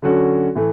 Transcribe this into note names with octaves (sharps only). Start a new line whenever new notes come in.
D3 F#3 C#4 F#4 A4
A2 E3 A3